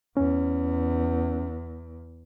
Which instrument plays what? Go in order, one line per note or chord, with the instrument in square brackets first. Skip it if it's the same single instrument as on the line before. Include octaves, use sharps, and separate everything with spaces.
[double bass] E2 [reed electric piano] C#4